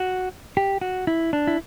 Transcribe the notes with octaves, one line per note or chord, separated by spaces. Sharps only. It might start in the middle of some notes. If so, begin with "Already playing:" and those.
Already playing: F#4
G4
F#4
E4
D4
E4